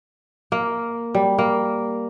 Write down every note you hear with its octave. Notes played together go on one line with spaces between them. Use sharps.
A#3
G3
A#3